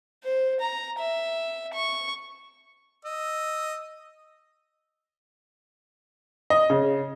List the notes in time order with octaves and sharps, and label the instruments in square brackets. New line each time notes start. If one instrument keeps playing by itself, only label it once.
[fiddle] C5
A#5
E5
C#6
[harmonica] D#5 E6
[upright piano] D#5
C#3